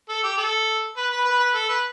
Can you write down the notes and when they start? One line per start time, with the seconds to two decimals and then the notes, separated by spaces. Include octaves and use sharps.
0.09 A4
0.23 G4
0.38 A4
0.97 B4
1.11 B4
1.25 B4
1.39 B4
1.55 A4
1.69 B4